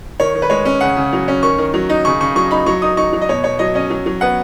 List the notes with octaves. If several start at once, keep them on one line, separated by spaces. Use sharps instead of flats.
D#3 C#5
D#3
B4
G#3 C#5
C#4
C#3 F#5
C#3
F#3
C#4
D#3 C#6
D#3
F#3
D#4
C#3 C#6
C#3 C#6
F#3 C#6
D#4 B5
F#3 C#6
D#4 D#6
D#4 C#6
F#3
D#5
B2 C#5
B2 C#5
F#3 D#5
C#4 D#5
F#3
F#3
B3 F#5